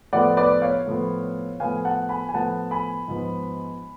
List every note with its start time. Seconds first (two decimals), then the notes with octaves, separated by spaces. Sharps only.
0.13 A2 F3 B3 D5 F#5
0.37 B4 D5
0.62 C#5 F5
0.87 A2 F3 B3
1.60 A2 F3 B3 F5 G#5
1.85 F#5 A5
2.09 G#5 B5
2.29 G#5
2.34 A2 F3 B3 F#5 A5
2.71 G#5 B5
3.08 G#2 F3 B3